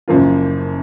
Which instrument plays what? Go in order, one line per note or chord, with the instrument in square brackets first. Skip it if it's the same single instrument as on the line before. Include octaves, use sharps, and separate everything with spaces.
[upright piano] F#1 F#2 F3 A#3 F4